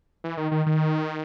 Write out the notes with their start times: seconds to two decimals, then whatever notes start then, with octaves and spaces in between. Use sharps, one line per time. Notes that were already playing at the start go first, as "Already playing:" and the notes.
0.24 E3
0.37 D#3
0.52 D#3
0.66 D#3